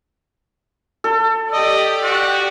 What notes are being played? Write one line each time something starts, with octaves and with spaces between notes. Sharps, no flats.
A4
G4 D5 D#5
F#4